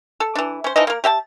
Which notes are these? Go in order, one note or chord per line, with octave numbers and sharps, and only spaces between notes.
A4
E3 D4
C#4 C5
E3 F3 D#4 D#5
A#3 A#4
G4 E5 G5 A5